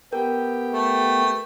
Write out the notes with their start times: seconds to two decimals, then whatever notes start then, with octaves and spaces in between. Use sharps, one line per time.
0.13 B3 G4 A#4 G5
0.73 A3